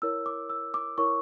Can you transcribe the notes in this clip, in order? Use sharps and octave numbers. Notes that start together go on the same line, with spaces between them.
E4 A#4 C#5 E6
D6
E6
D6
E4 A#4 C#5 C#6